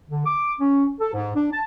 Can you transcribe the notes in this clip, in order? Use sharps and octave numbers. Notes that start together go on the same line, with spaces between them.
D3
D6
C#4
A4
G#2
D4
A5